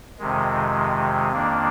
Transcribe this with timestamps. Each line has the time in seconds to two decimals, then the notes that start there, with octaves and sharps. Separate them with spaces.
0.19 F2 C3 D#3 G#3
1.32 F2 D#3 A#3 D4